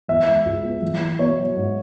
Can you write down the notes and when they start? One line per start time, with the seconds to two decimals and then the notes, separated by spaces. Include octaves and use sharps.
0.08 E2 E5
0.28 G#3
0.46 C#2
0.64 B3
0.82 A1
1.01 E3
1.19 B2 C#5
1.38 F#3
1.56 G#2